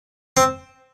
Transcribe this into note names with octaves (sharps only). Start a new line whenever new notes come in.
C4